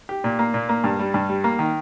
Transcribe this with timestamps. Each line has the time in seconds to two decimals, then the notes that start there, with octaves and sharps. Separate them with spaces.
0.09 G4
0.24 A#2
0.39 A#3
0.54 A#2
0.69 A#3
0.84 G2
0.99 G3
1.14 G2
1.29 G3
1.44 A#3
1.59 D#3